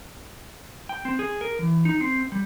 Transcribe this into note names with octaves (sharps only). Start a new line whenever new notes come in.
G5
C4
G#4
A#4
E3
D#4
C4
G3